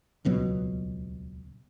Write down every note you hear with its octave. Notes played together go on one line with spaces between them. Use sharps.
D#1 C#2 B2 F#3